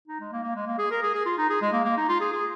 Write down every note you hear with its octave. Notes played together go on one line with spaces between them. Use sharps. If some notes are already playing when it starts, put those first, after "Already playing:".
D#4
G#3
A#3
A#3
G#3
A#3
G#4
A#4
G#4
G#4
F4
D#4
G#4
G#3
A#3
A#3
D#4
F4
G#4
G#4